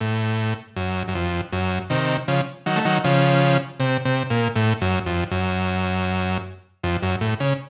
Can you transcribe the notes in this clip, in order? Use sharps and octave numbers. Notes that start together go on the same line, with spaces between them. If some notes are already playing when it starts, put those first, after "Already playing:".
A2
F#2
F#2
F2
F#2
C3 D#3
C#3 F3
D#3 F#3
A3
D#3 F#3
C#3 F3
C3
C3
A#2
A2
F#2
F2
F#2
F2
F#2
A2
C#3